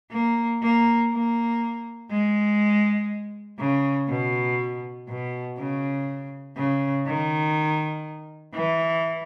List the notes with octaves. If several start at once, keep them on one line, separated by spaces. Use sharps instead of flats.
A#3
A#3
A#3
G#3
C#3
B2
B2
C#3
C#3
D#3
E3